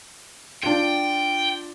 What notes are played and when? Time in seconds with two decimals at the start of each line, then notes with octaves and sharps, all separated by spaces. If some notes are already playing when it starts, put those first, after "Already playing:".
0.63 D4 F4 G5